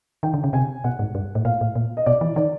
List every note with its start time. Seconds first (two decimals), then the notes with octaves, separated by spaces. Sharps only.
0.23 D#3 G5
0.34 D3
0.44 C#3
0.53 C3 G#5
0.84 B2 F#5
0.99 G#2
1.15 G2
1.35 A2
1.45 A#2 F5
1.61 A2
1.75 A#2
1.97 D#5
2.06 B2 D5
2.21 E3
2.36 D#3 D5